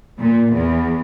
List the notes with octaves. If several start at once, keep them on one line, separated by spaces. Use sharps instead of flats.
A#2
E2